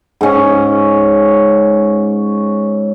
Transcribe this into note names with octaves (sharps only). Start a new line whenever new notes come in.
G#2 C#4